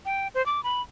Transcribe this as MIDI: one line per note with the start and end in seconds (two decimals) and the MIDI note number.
0.06 0.28 79
0.35 0.44 72
0.46 0.63 86
0.64 0.82 83